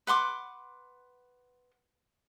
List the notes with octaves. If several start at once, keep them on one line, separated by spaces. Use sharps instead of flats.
B4 F#5 C6 D6